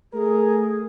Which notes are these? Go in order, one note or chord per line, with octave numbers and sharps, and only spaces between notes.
A3 G#4 A#4